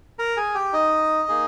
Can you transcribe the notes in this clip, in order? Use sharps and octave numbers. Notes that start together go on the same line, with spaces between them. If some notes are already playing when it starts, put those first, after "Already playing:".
A#4 A#5
G#4 G#5
G4 G5
D#4 D#5
A#3 D#4 G#4